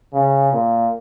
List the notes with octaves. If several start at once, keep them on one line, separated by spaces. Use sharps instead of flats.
C#3
A#2